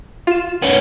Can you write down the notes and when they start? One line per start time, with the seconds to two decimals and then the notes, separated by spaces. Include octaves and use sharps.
0.27 F4 E7
0.62 B3 C#4